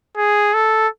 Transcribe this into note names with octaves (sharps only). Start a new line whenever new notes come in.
G#4
A4